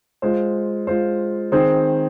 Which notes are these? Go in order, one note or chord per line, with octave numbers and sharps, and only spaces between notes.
G#3 F4 C5
G#3 F4 C5
D#3 C4 G#4 C5